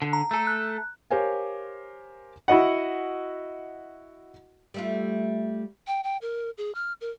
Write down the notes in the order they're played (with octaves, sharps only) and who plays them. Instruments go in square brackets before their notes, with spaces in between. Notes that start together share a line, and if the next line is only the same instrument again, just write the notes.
[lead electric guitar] D3
[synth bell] A#5
[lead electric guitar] A3 A4
[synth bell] F#6
[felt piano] G4 A#4 C5 C#5 F5 G#5
[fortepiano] E4 F#4 D#5 F#5
[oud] G3 A3 F4
[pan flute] G5
G5
A#4
G#4
F6
A#4